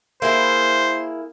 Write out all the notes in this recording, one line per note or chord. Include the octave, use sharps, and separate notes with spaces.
A#3 E4 G#4 C5